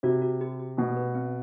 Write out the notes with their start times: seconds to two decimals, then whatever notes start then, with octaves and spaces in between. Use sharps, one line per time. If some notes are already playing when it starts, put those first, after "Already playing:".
0.03 C3 F#4
0.22 F#4
0.41 G4
0.60 G4
0.77 B2 A3
0.96 B4
1.15 C4